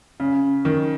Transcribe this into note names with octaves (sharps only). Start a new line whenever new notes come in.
C#3
D#3